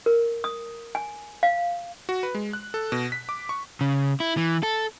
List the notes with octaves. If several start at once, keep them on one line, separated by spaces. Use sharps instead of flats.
A#4
D#6
G#5
F5
F#4
B4
G#3
F#6
A4
B2
B6
D6
C#6
C#3
E4
E3
A4